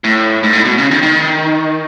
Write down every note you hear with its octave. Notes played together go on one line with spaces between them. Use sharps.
A2
G#2
A2
B2
C#3
D#3
D#3